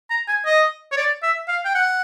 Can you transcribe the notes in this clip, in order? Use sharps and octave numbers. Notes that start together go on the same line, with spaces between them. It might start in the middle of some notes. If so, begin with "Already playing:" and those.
A#5
G#5
D#5
C#5
D5
E5
F5
G5
F#5